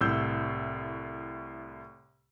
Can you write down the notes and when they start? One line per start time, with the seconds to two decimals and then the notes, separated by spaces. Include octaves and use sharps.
0.01 C2 A2 E6 G6